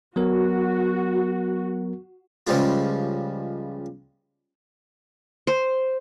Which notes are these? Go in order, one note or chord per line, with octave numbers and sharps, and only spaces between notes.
F#3 B3 F#4 A#4
C#2 C#3 F3 G3 G#3 F4
C5